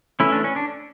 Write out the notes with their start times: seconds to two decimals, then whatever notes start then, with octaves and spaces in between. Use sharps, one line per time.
0.20 E3 A3 C#4 E4
0.32 D4
0.44 C#4
0.56 D4